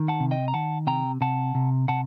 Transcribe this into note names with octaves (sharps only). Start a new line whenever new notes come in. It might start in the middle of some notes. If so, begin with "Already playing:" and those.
Already playing: D#3
F#5 A5
C3
D#5 G5
A#5
D#3 F#5 A5
C3 G5 A#5
C3 F#5 A5
C3
C3 F#5 A5